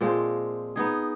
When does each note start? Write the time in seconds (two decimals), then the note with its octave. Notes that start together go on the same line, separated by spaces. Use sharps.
0.01 A#2 F3 G#3 C4
0.76 B3 D#4 G#4